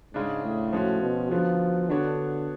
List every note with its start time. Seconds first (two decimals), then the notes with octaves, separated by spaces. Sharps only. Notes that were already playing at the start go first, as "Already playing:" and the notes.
0.14 G#2 C#3 G#3 D4
0.43 A2
0.73 F3 G#3 C#4 F#4
1.02 B2
1.31 D3 F3 F#3 B3 F4
1.90 D3 B3 D4 F#4 C#5